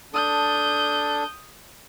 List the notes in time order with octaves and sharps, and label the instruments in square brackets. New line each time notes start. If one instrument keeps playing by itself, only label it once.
[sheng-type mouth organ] D4 A4 [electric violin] D#6 G6